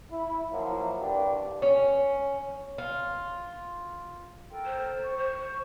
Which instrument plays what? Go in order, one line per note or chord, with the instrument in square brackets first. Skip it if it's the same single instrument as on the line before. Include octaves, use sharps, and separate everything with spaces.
[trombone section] E4
F3 F#3 A#3 E4
C2 G2 D4 G4
[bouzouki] C#4
F4
[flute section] A4 A#4 G5
[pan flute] C5
[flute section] C#6
[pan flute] C5